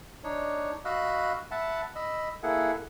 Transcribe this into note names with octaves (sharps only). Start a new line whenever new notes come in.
D4 D#4 C#5
F#4 D#5 F5 B5 E6 F#6
E5 F#5 A5 B5
D#5 B5 E6
A#3 E4 G#4 A4 F#5